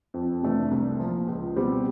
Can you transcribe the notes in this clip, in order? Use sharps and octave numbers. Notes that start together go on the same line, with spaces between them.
F2
C3 E3 A3 D4
C2
A#2 F3
C#2
B2 G3 C4